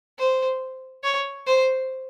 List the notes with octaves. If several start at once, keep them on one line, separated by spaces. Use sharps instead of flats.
C5
C#5
C5